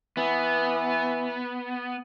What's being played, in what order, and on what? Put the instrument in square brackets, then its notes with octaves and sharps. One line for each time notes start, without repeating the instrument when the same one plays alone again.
[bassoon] E3 [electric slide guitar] B3